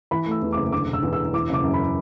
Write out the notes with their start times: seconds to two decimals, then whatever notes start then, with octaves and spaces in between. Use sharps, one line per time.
0.11 E3 B5
0.26 A3 E6
0.42 E2
0.53 D6
0.56 F#1
0.72 D3 D6
0.87 E1
0.93 E6
1.03 E2
1.13 E6
1.18 E1
1.33 E3 D6
1.49 F#1 D6
1.64 F#2
1.74 B5